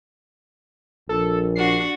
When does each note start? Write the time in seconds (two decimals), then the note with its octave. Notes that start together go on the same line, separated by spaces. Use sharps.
1.09 A#1 A4
1.56 D4 F#4 C7